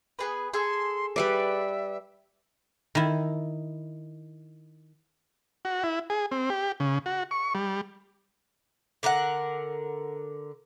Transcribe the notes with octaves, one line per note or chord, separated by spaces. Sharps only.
B3 G#4 B4
G#4 A4 C6
G3 B4 D5 E5
D#3 E4
F#4
E4
G#4
C4
G4
C#3
F#4
C#6
G3
D3 A#4 D#5 F#5